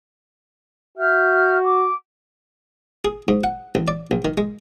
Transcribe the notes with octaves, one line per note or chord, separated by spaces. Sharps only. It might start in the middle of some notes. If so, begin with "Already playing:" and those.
F#4 E5 F6 G6
D6
G#4
G#2
F#5
A1
D5
A#1
D#3
G#3